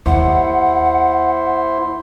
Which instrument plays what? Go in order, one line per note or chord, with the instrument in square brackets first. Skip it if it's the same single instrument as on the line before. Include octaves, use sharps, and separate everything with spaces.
[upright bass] D#2 [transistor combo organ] E4 C5 [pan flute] F#5